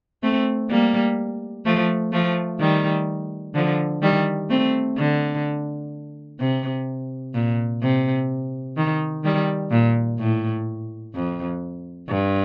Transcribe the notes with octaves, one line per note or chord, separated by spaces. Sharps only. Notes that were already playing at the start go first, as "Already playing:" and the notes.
A3 C4
G3 A#3
F3 A3
F3 A3
D#3 G3
D3 F3
D#3 G3
A3 C4
D3
C3
A#2
C3
D#3
D#3 G3
A#2
A2
F2
G2